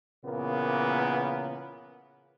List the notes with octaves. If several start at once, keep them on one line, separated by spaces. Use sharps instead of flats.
A#2 C#3 E3 A#3 B3